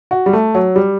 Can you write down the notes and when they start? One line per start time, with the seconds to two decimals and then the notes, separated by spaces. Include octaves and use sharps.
0.11 F#4
0.26 G3
0.33 A3
0.55 F#3
0.76 G3